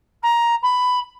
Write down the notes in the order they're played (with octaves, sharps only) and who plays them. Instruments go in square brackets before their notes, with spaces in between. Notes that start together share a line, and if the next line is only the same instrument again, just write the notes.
[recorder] A#5
B5